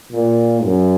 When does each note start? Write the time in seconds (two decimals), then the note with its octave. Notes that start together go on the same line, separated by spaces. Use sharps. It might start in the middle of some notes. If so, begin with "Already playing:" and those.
0.12 A#2
0.64 F#2